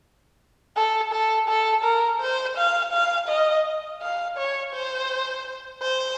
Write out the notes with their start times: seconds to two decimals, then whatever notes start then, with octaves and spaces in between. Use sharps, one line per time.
0.76 A4
1.13 A4
1.48 A4
1.84 A#4
2.21 C5
2.57 F5
2.93 F5
3.29 D#5
4.02 F5
4.38 C#5
4.74 C5
5.82 C5